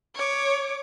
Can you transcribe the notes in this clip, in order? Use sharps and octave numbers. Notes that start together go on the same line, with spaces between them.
C#5 D6